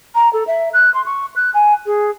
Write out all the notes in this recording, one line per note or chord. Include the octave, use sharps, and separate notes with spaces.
A#5
A4
E5
F#6
C6
C#6
F#6
G#5
G#4